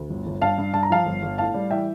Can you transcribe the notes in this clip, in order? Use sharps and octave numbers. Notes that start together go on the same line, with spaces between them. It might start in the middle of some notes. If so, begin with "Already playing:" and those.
Already playing: D2
G1
G1
G2 F5 A5
G2
G2 A5
A#5
F3 F5 A5
G1
G1
A2 F5 A5
G3
E3 E5 G5